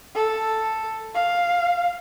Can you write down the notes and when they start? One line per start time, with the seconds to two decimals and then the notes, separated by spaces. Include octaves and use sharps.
0.15 A4
1.14 F5